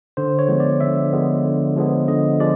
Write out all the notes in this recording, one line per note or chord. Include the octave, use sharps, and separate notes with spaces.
D3 C5
C#5
F3 G#3 B3
D5
D3 E5
F3 G#3 B3
D3
F3 G#3 B3
D3 D#5
F3 G#3 D5